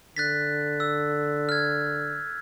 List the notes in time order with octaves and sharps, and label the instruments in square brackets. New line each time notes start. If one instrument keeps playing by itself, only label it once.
[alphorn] D3 [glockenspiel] F#6 A6 B6
[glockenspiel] E6
F6 G#6